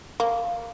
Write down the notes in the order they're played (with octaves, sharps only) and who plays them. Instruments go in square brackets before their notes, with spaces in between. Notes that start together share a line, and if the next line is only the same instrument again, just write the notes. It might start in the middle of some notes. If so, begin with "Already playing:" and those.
[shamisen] A#3